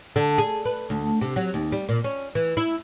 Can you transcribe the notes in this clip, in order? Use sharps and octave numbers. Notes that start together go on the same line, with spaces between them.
D3
G#4
B4
D2
C3
F#3
D#2
G3
A#2
C#4
E3
E4